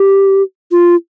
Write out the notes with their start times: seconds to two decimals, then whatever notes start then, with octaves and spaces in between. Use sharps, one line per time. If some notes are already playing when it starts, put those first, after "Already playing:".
Already playing: G4
0.72 F4